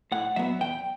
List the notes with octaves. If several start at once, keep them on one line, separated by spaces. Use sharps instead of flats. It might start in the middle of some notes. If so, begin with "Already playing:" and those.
A2 F#5
F#3 B3 E5
E2 G5